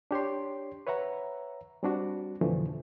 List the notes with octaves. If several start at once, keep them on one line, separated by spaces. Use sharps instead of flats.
D4 G4 C#5 C6
B4 C#5 E5 F#5 A#5
G3 C4 D4 F#4
F2 B2 D3 E3 F3 A3